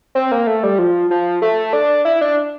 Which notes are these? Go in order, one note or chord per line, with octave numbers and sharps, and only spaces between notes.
C4
A#3
A3
G3
F3
F3
A3
D4
E4
D4